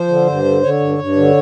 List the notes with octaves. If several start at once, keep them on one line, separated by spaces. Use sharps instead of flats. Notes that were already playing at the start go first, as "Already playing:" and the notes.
Already playing: F3 C5
D3
G2
D3
D3 C#5
G2
G2
D3